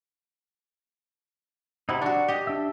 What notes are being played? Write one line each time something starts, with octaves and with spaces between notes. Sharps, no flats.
C3 D#4 E4 F#4 B5
D4 F#4 D5 F#5 C#6
G4 D#5
D4 E5